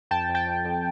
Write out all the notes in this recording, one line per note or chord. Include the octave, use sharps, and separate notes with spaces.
F2 G5 A5
F2
G5 A5
F2
F2